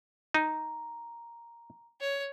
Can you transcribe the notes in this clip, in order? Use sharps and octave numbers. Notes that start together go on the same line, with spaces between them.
D#4 A#5
C#5